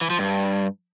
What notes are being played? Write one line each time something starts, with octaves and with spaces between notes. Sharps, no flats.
E3
F3
G2